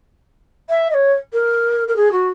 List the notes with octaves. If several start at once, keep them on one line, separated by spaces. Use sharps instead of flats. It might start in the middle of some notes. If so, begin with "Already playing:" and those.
E5
D#5
C#5
A#4
A#4
G#4
F#4